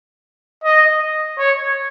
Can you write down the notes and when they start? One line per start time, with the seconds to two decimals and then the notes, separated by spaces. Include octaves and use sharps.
0.63 D#5
1.39 C#5